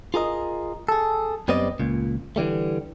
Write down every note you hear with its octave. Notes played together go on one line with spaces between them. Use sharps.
F4 G#4 A#4 D#5
G#4 A4
F#2 G3 B3 C4 D5 D#5
C#2 A#2
D3 E3 G3 A3